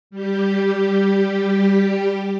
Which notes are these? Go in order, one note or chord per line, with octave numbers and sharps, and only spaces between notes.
G3 G4